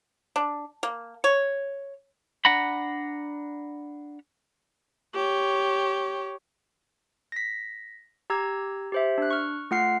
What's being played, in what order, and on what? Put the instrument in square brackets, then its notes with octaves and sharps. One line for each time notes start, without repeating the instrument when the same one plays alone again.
[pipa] D4
A#3
C#5
[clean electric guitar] D4 F#5 A#5 B5
[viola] G4 C#5
[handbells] A#6 B6
G4 A#5 E6 G#6
G4 C5 E5
D4 F#6
C#6 F6
A3 F4 F#5 F6 C7